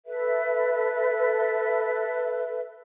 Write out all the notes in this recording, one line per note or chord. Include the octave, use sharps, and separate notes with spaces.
A4 B4 E5